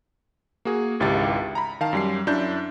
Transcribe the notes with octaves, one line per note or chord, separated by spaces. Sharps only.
A#3 F#4 G#4
G#1 C#2 E4 G4 A6
A#5 B5
D#3 F5 A5
F#2 G3 C7
F#2 D4 E4 G6